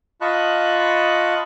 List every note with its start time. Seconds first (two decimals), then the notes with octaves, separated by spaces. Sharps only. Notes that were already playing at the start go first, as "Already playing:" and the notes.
0.21 F4 D#5 A5 B5 C#6 F#6